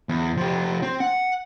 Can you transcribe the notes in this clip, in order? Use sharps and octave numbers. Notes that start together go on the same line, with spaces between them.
E2
F3 G4
C4
F#5